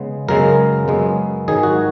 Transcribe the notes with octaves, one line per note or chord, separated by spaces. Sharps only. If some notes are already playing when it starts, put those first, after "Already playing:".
Already playing: C#3 G#3 B3
F#2 C#3 G#3 B3 A#4
F#2 C#3 G#3 B3
G#2 D#3 F#3 G#4
F#4